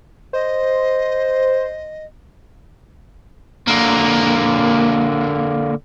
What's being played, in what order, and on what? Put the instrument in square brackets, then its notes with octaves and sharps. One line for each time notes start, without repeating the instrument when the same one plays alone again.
[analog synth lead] C5 [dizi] D#5
[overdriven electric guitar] D3 A#3